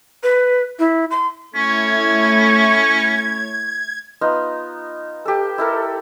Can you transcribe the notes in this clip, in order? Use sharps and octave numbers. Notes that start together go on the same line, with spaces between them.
B4
E4
C6
A3 C#4 E4 C#5 C#6 G#6
B3 D#4 F4
G4 A4
E4 A4 A#4